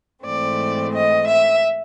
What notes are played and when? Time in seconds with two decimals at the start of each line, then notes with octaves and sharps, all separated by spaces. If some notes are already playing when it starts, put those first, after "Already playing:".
0.24 G#2 E3 A3 C4 D5
0.92 D#5
1.27 E5